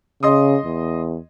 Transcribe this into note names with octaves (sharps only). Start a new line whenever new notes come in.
C#3 D#5 C6 D#6
E2